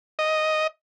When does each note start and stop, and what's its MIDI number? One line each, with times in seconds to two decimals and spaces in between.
0.19 0.67 75